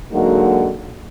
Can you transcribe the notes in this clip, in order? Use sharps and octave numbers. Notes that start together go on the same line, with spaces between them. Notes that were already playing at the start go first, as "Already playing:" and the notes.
D3 F#3 G#3 A#3 D#4 F#4